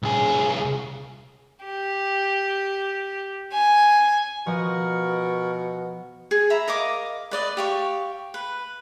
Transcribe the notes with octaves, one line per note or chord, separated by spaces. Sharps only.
C2 G#4
G4
G#5
B2 F3 A#4 D#5 F#5 C#6
G#4
E5 A#5 B5
A#4 D#5 F5 D6
B4 D5 D#5
G4 F5 C#6
B4